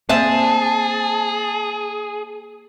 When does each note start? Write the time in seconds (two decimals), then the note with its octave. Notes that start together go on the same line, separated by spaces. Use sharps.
0.09 A#3 C4 G#4 C5 E5 A5